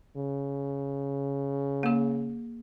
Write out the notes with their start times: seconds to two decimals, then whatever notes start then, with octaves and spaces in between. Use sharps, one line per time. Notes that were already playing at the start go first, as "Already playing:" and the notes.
0.17 C#3
1.83 A#3 G#4